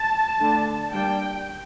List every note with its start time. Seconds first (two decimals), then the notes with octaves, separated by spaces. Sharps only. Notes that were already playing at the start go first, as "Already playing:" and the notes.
Already playing: A5
0.39 D3 A3 D4
0.91 G3 A#3 D4 G5